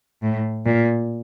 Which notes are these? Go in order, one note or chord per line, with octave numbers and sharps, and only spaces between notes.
A2
A#2